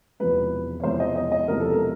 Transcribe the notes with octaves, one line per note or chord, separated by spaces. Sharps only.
E1 E2 C3 F3 G#3 B4
C#5
E1 E2 C3 F3 G#3 C5
D#5
D#5
D#5
E1 E2 C3 F3 G#3 A#4
A4
A#4